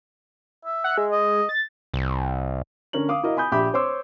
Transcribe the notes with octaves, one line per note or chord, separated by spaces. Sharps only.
E5
F#5
G#3
D#5
A6
C2
D3 C#4 A#4 F#7
F5 D6 D#6
E4 F#4 A#4 D#5 F5
G#5 B5 D#6 G6
A#1 G4 E5 B5 D6 G6
C5 C#5 C6 D6 E6